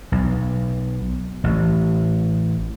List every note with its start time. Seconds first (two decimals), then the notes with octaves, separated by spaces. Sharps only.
0.12 B1
1.44 A1